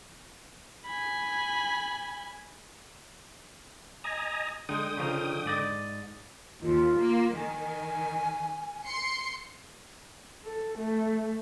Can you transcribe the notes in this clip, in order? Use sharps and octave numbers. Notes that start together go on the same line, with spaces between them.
G#5 B5
D#5 G#5 A#5
D3 G#3 D#4 G5 D#6
C#3 F3 D#4
G#2 D5 D#5
D#2 F4
A#3
D#3 G#5
C6 C7 C#7
A4
A3